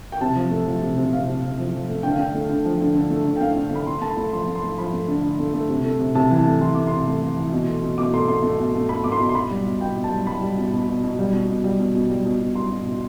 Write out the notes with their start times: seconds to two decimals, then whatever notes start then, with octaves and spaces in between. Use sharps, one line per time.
0.12 G5
0.21 C3 A5
0.36 F3
0.51 A3
0.66 F3
0.82 C3
0.98 C3
1.13 C3 F5
1.28 C3
1.43 C3
1.59 F3
1.74 F3
1.89 A3
2.03 D3 G5
2.12 F5
2.19 D3 G5
2.35 A3
2.50 D3
2.65 F3
2.80 D3
2.95 D3
3.10 A3
3.25 D3
3.37 G5
3.40 A3 F5
3.56 D3
3.71 A3 B5
3.87 A3 C6
4.02 A3 A5
4.10 B5
4.17 A3
4.33 F3 C6
4.47 A3
4.55 C6
4.63 A3
4.78 F3 B5
4.93 A3
5.08 D3
5.23 D3
5.39 A3
5.54 A3
5.69 C3
5.85 A3
6.00 C3
6.15 C3 A5
6.31 E3
6.38 A5
6.46 A3
6.61 E3 C6
6.74 A3 D6
6.87 C3 C6
7.07 A3
7.22 A3
7.37 E3
7.52 B2
7.68 A3
7.83 B2
7.98 B2 D6
8.14 A3 C6
8.28 A3 C6
8.44 A3
8.59 B2
8.75 A3
8.89 A3 B5
9.04 A3 D6
9.12 C6
9.20 B2
9.29 C6
9.35 B2 B5
9.50 G3
9.66 B2
9.81 B2 G5
9.96 B2
10.04 A5
10.11 G3
10.27 G3 B5
10.42 G3
10.58 B2
10.73 B2
10.89 B2
11.04 B2
11.19 G3
11.33 B2
11.49 B2
11.64 G3
11.79 B2
11.95 B2
12.10 G3
12.25 B2
12.40 B2
12.55 G3 C6
12.71 B2
12.86 B2